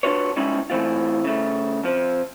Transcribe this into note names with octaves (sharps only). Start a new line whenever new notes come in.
D4 F4 F#4 B4 C#5
G3 G#3 C#4 D#4 E4
A2 E3 C4 F4
C#3 A3
F2 F3